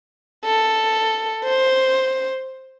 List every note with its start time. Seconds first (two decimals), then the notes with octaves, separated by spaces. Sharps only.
0.45 A4
1.44 C5